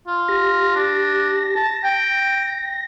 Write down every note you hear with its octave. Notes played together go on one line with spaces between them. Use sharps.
F4
G4 A#6
D4
A5 A#6
G5